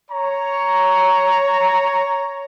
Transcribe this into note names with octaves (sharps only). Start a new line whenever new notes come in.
C#5 A#5 C#6